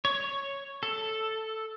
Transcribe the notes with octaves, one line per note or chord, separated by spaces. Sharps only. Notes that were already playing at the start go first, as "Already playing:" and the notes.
C#5
A4